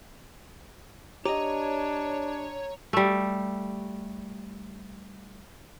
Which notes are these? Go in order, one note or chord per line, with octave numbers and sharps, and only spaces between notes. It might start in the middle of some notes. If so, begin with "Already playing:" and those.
D4 G4 C#5 D#5 A#5 D#7
G3 A3